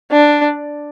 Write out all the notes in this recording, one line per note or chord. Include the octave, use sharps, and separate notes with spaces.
D4